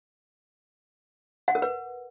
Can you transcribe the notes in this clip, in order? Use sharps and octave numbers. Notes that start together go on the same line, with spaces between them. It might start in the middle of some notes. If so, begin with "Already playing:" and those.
F#5
A#4
B4